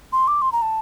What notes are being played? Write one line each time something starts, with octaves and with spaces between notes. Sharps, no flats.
C6
D6
C6
A#5
A5